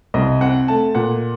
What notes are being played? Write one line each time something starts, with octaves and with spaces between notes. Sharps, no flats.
C2 D#5
C4 F#5
A3 A5
A#2 F#5